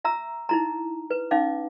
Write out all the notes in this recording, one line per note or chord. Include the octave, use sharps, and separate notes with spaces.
E5 A#5 E6
D#4 E4 A#5
B4
C#4 D#4 F5 D6